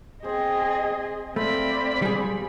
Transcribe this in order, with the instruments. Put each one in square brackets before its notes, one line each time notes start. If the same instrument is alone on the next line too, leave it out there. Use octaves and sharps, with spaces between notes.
[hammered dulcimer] C4 [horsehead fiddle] G#4 D#5
[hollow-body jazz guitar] A3 [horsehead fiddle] C4 D5 [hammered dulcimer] C5 F5 [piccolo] B5
[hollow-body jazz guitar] G3 G#4